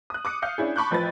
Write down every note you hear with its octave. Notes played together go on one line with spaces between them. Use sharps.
D#6 F#6
D6 D#6 C#7
F5 D#6 G6 C#7
C#4 D4 E4 G#4
A5 B5 C#6 D6 F#6 G6
A1 F3 B4 B5 A6